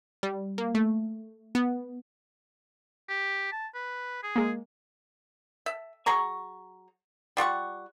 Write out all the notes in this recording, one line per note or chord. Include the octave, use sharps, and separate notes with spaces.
G3
A#3
A3
B3
G4
A5
B4
G#4
G#3 A#3
E5
F#3 G#4 A#5 C#6
G3 F4 F#5 C#6